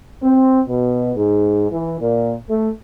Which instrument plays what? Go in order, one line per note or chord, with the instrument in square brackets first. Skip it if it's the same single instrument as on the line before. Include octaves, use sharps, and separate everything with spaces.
[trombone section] C4
B2
G#2
E3
A#2
A3